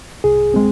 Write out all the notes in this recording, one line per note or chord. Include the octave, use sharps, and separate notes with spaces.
C2 G#4
G#3 C4